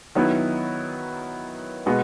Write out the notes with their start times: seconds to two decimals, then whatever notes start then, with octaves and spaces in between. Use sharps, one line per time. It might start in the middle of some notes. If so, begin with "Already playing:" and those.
0.15 D#3 F#3 B3 E4
1.86 B2 G#3 B3 F#4